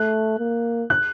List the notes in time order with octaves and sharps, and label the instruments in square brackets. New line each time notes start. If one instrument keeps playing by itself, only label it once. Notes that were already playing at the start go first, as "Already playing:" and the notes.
Already playing: [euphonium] A3 [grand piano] F#6
[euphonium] A#3
[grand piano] F#6